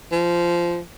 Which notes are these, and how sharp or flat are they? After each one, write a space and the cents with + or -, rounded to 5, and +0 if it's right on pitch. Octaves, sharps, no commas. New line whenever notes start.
F3 -15